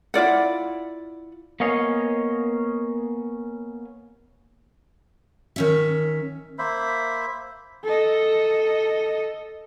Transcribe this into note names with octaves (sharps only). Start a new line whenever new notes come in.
E4 F4 D5 F#5
A#3 B3 C#4 C#5 D#5 F5
D#3 C#4 E5
A#3 C5 E5 B5
A4 D#5